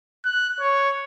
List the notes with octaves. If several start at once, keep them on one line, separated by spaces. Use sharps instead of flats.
F#6
C#5